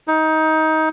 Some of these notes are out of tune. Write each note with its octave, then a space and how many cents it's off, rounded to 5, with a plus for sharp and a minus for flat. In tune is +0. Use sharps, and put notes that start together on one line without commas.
D#4 +20